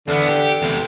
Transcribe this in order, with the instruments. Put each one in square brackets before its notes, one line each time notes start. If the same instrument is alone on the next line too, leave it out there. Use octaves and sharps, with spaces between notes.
[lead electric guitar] E2 B3 [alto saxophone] D3
[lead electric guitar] G4
E2 C3